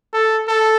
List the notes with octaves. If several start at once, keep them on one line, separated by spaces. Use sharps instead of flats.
A4
A4